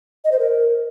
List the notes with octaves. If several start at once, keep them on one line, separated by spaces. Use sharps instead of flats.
D#5
C5
A#4